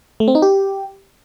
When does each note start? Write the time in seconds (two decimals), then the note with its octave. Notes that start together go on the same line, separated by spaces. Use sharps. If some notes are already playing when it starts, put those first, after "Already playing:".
0.20 A3
0.28 C4
0.35 D#4
0.42 G4